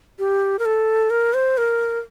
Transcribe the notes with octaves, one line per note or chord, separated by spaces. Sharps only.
G4
A#4
A4
A#4
C5
A#4